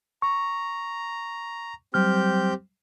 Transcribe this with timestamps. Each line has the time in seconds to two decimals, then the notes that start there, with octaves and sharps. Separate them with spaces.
0.22 A#5 C#6
1.94 F#3 G3 C4 G4 F6 G6